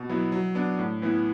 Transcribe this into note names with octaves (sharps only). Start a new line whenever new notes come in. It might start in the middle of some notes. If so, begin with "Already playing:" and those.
Already playing: B2
F#3 B3 E4
F#3
B3 D4
A2
E3 B3 E4